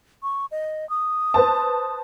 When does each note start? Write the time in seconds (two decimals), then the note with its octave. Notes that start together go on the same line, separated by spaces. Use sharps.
0.23 C#6
0.51 D#5
0.90 D#6
1.34 B4 C5 A5